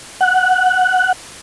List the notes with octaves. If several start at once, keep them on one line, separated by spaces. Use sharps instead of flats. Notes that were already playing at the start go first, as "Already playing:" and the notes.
F#5